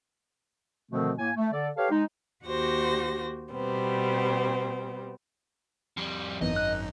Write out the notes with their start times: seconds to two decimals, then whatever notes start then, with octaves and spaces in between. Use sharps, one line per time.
0.92 B2 D3 D#3 F3 A3 C4
1.19 A2 A#3 G#5
1.36 A3
1.53 D3 A4 D5
1.76 G4 A4 B4 C#5 F5
1.91 G#3 D#4
2.44 D#2 F#4 G4 C5 A#6
3.52 B2 G3 B3 C4
5.97 F2 G3
6.41 G#1 F#2 E3 B3 D#4 D#5
6.56 F#6